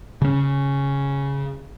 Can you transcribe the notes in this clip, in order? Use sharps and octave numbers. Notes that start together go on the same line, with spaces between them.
C#3 C#4